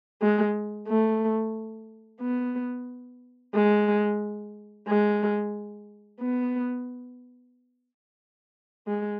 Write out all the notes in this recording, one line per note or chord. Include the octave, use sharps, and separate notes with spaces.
G#3
A3
B3
G#3
G#3
B3
G#3